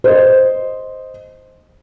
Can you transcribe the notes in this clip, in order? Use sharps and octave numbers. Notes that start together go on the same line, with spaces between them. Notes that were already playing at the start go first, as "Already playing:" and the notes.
C5 D#5